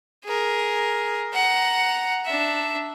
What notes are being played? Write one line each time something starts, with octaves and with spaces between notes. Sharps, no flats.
G#4 A#4
F#5 A#5
D4 E5